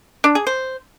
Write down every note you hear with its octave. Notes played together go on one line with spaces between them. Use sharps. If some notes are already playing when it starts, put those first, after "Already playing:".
D4
G#4
C5